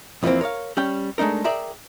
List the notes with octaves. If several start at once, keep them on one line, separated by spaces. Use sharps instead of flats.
F2 E3 F3 G3 A#3 C4
A#4 C#5 D5 F5
G3 C#4 G5
G#3 A3 D4 D#4 A#4
G#4 A#4 D5 E5 G5 A#5